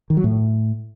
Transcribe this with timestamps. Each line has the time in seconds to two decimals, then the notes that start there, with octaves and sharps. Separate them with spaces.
0.10 D#3
0.17 F#3
0.24 A2